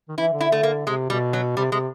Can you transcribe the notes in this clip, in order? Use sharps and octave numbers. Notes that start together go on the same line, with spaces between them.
D#3
E3 E4
D3
E4
D3 A3
D3 A#3
C3 G#3
B2 G3
F#3
C3 G3
C3 G#3